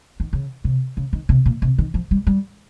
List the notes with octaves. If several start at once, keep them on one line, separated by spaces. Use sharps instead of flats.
D#3
C#3
C3
C#3
D#3
C3
A#2
C3
D#3
F3
G3
G3